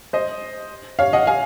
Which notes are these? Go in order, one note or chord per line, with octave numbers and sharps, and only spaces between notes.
C5 D#5
C#5 F5
D#5 F#5
F5 G#5